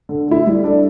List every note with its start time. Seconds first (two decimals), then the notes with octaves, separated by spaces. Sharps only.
0.09 D3
0.28 A3 E4
0.47 G3
0.64 D4 A4